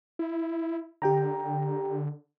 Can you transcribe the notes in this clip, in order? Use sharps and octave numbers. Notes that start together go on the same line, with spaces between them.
E4
D3 G4 G5 A#5